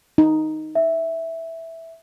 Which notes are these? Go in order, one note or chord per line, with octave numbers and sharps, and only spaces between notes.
D#4
E5